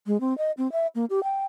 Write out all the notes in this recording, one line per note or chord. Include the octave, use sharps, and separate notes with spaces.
G#3
C4
D#5
C4
E5
A#3
G4
G5